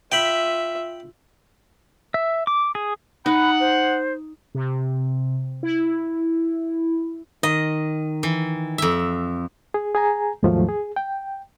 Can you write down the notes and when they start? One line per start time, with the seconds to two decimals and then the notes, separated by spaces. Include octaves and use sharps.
0.12 F4 E5 G5 B5
2.14 E5
2.47 D6
2.75 G#4
3.26 D#4 F#5 B5
3.60 C5
4.55 C3
5.63 E4
7.43 D#3 D#5
8.23 E3
8.78 F2 E5
9.74 G#4
9.95 G#4 G#5 A#5
10.43 D#2 G#2 D#3 F3 F#3 A3
10.69 G#4
10.96 G5